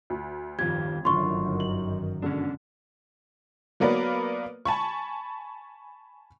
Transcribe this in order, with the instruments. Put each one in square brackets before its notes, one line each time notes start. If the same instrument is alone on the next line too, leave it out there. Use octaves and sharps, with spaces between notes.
[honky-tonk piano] D2
[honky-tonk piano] G1 F2 [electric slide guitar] D#3 F4 G4 [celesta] G#6
[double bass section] G1 F#2 D#3 [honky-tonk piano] A2 D3 [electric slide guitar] F4 [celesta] C6 C#6
[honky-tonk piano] F#7
[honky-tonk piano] B2 D3 G#3 [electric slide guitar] C#4 D4
[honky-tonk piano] F#3 A#3 B3 A#4 B4 D5
G#5 A5 B5 C#6